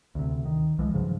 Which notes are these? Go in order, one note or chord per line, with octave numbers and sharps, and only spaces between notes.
D2 C3
D#3
C2 E3 F3 G#3
G2 C#3 F3 F#3